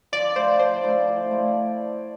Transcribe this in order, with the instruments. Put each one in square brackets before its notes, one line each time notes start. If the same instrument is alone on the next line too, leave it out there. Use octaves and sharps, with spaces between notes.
[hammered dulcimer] F3 [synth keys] D5
[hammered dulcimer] A3 E4 [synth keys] C5
[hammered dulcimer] F3 [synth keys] C5
[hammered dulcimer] A3 E4
F3
A3 E4